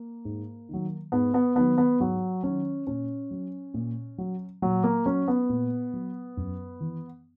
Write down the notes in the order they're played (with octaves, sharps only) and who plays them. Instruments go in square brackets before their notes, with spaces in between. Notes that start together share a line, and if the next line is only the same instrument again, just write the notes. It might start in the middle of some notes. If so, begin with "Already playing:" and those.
Already playing: [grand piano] A#3
G#2
D#3 F#3
G#2 B3
B3
D#3 F#3 B3
B3
G#2 F#3
D#3 F#3 C#4
A#2 C#4
F#3
A#2
F#3
A#2 F#3
A#3
F#3 C#4
B3
A#2
F#3
F#2
E3